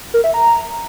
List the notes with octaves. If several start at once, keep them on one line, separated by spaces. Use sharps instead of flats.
A#4
E5
A#5